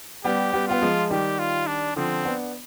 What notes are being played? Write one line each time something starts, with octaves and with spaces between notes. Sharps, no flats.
G3 B3 G4
G3 B3
B3 F4
F3 G#3
D#3 G3 G4
F4
D4
D3 F3 C4
B3 D4